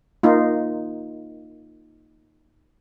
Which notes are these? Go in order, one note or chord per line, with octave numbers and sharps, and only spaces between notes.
A#3 D#4 F4